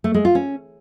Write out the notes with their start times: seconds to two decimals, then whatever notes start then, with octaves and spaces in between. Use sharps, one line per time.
0.04 A3
0.14 G#3
0.25 F4
0.35 C#4